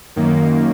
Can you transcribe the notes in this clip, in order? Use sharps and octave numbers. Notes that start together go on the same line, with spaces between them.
F#2 D#3 A#3